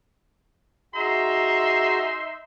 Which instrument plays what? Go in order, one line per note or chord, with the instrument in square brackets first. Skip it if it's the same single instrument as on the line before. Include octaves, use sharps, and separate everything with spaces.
[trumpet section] D#4 E5 C6 [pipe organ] F#4 G#4 A#5